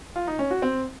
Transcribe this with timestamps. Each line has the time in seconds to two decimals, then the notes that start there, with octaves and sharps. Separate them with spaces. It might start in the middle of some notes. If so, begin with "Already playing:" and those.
0.16 F4
0.27 D#4
0.39 C#4
0.51 F#4
0.62 C4